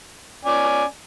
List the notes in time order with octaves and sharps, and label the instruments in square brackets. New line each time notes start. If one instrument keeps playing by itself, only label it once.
[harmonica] C#4 D5 G#5